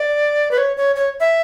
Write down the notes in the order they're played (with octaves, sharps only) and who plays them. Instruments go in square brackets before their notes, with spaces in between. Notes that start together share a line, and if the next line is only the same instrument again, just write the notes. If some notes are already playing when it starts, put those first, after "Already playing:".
Already playing: [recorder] D5
B4
C#5
C#5
C#5
E5